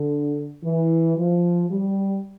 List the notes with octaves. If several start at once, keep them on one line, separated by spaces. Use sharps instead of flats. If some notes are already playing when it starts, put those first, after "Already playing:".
Already playing: D3
E3
F3
G3